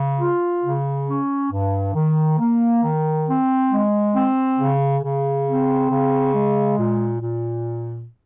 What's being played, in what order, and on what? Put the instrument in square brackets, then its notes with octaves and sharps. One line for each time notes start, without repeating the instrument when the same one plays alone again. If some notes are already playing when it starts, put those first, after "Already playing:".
Already playing: [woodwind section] C#3
F4
C#3
C#4
G2
D#3
A#3
D#3
C4
G#3
C4
C#3
C#3
C4
C#3
G#3
A#2
A#2